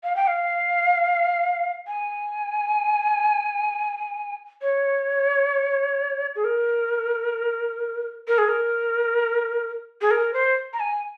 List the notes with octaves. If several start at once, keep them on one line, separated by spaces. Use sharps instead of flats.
F5
G5
F5
G#5
C#5
G#4
A#4
A#4
G#4
A#4
G#4
A#4
C5
A#5
G#5